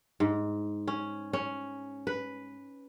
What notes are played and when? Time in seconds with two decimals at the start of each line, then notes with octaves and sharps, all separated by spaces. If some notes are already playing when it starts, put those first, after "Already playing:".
0.20 G#2
0.88 C#4
1.33 C#4
2.07 B4